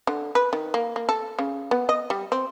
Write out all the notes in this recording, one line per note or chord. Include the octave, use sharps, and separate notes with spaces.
D3
B4
D#3
A#3
A#3
A4
C#3
B3
D#5
G3
C4